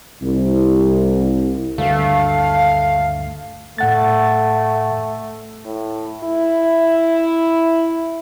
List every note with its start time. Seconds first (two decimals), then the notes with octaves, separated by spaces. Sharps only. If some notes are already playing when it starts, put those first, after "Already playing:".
0.21 C2
1.78 D2 G2 A3 F5
3.78 A2 A3 F#5 A6
5.65 A2
6.24 E4